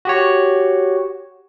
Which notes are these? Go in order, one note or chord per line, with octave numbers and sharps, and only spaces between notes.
F#4 G4 C#5